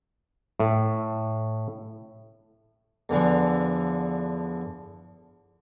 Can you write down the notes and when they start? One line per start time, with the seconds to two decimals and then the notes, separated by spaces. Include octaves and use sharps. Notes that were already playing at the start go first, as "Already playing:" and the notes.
0.60 A2
3.09 E2 D3 E3 F3